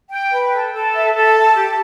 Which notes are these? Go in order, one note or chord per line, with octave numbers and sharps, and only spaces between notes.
G5
B4
A4
A4
E5
A4
A5
G4